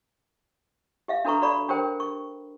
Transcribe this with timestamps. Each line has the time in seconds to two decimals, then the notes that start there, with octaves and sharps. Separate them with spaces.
1.08 G4 E5 F5
1.25 D4 F#4 A4 B4 A#5 C#6
1.42 F#4 A4 D5 B5 C#6
1.68 D4 G4 A#4 C5 G5
2.00 C#6